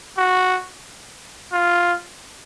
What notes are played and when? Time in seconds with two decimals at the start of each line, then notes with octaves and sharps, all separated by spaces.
0.18 F#4
1.53 F4